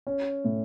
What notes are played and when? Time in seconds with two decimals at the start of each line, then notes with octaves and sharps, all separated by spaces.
0.07 C#4
0.45 A2